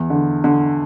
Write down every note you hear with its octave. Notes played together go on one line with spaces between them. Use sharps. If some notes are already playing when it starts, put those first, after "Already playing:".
Already playing: E2
D3
D3